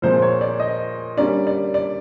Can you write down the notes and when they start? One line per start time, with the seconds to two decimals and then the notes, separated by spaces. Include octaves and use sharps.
0.02 A#2 F3 G#3 C4 C5
0.22 C#5
0.41 D5
0.60 D#5
1.17 D3 G3 A#3 C#4 D5
1.47 D5
1.74 D5